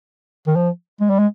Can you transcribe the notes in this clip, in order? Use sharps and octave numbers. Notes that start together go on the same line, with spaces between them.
D#3
F3
G#3
G3
G#3